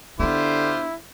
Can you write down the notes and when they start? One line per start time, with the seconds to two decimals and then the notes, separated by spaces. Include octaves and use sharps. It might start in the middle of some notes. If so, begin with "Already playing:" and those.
0.20 D3 B3 D4 E4 F4 G4 C5